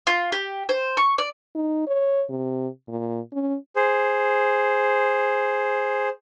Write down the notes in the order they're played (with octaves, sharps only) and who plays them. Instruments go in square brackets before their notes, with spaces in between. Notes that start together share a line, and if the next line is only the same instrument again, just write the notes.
[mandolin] F4
G4
C5
C#6
D5
[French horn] D#4
C#5
C3
A#2
C#4
[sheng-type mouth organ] G#4 C5